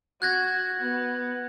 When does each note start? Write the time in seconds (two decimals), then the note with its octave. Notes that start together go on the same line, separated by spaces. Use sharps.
0.22 F#4 F#6 G#6 A#6
0.81 B3